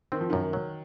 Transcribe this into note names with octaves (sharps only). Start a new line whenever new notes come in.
D#3 C4
F3
F#2 D#3
F#3